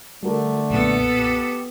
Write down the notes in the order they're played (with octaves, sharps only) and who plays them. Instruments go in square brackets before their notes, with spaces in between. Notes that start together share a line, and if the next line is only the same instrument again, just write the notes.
[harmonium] D3 A3 D4 [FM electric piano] G3 F#4 A#4
[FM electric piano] B1 F#2 A#2 [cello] B3 A4
[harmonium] G4